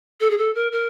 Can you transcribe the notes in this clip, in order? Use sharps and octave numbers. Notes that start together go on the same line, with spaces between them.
A4
G#4
A4
A#4
A#4